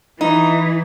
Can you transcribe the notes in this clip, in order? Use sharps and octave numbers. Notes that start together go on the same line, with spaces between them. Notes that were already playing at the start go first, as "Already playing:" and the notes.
E3 D#4